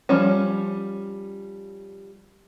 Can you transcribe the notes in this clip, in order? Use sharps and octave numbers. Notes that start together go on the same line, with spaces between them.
F3 G3 C#4